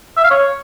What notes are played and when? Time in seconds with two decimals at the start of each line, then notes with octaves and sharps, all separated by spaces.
0.17 E5
0.24 F5
0.31 C#5